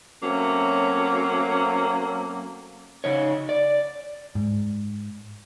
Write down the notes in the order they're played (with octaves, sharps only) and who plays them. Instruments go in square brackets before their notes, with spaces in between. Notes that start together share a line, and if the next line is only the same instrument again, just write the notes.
[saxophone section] F#3 A3 A#3 C4 C#4
[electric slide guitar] C#3 D#4 C#5
D5
[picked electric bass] G#2